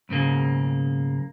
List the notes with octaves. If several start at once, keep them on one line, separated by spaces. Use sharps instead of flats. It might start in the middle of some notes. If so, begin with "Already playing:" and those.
B1 G#2 C#3 A#3